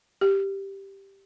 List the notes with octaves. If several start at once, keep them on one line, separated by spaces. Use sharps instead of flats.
G4